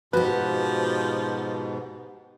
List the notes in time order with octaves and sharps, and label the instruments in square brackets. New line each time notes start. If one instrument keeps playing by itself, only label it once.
[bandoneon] G#2 B2 [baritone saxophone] F3 [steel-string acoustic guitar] F#4 G4 [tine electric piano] B4